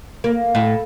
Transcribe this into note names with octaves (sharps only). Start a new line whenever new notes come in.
A#3
A2